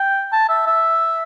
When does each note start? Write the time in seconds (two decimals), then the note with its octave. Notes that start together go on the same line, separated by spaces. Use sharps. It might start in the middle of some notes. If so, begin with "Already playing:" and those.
Already playing: G5
0.33 A5
0.49 E5
0.67 E5